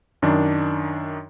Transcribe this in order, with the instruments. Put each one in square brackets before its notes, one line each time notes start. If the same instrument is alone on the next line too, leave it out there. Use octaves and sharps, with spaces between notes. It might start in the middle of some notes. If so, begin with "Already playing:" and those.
[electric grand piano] F#2 D#3 D4